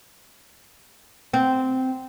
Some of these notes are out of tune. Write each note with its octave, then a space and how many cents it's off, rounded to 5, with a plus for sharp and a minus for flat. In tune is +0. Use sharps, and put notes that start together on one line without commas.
C4 -10